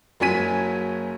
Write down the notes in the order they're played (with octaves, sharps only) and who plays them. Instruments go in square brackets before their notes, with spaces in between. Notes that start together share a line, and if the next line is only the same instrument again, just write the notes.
[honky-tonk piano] F#1 F#3 C#4 G#5 B6 D#7